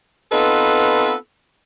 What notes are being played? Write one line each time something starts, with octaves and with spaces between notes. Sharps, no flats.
B3 C4 D#4 F4 A4 B4